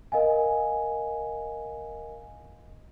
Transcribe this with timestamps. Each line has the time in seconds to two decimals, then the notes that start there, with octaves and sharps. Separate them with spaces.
0.12 A#4 D#5 F5 G#5